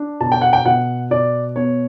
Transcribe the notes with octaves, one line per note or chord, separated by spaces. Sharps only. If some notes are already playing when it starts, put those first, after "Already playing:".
Already playing: D4
B2 A5
G5
F#5
G5
B2 F#5
B2 D5
B3 C#5